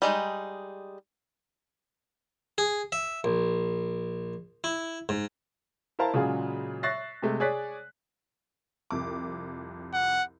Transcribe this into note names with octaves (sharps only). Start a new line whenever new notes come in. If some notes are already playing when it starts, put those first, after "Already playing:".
G3 G#3 D#4
G#4
E5
A#1
E4
G#2
E4 A#4 C5 F5 A5 A#5
A#2 C#3 F#3 G#3 F4 G#4
E5 C#6 F#6 A6 A#6 C7
C3 G#3 A3
G#4 C#5 D5 F#6 B6
C2 F2 D6
F#5